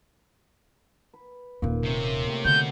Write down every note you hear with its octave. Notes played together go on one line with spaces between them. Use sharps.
B4
D#1 A#2 D#4
C3 C#4 E5
A2 G4
B2 D3 E3 C5 G6